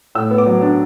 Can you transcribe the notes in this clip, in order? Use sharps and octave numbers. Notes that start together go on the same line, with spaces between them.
A2 E6
B3
D6
F#3
D4